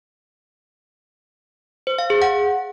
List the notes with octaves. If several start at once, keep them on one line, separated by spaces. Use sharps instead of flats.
C5
F5
G#4
F#5